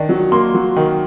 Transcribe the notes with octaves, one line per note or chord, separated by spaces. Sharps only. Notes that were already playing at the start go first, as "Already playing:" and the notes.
Already playing: D#3 D4
F#3
A#3 C6
F#3
D#3